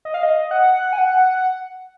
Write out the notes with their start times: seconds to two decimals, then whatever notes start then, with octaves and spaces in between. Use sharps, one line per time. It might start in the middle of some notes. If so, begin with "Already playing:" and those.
0.05 D#5
0.14 F5
0.23 D#5
0.51 F#5
0.93 G#5
0.98 F#5